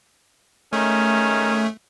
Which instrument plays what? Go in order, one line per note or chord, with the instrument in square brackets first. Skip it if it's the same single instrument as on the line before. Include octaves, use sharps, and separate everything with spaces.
[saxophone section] D#3 G#3 C#4 [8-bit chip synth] A3